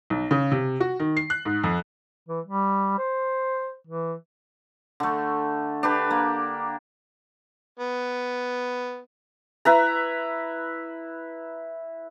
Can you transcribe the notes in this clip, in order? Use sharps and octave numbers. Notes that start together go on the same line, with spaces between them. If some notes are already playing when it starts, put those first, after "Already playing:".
B1
C#3
C3
F#4
D#3
C7
F#6
G#2
F2
E3
G3
C5
E3
D3 A3
D4 G4 B4
A#3
B3
E4 B4 A#5